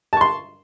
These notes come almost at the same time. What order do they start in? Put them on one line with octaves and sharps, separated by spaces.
A5 C#6 C6